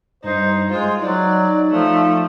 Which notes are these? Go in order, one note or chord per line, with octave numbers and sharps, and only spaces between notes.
G2 D#4 C5
G#3 F4 C5
F#3 D#4 D5
F3 A3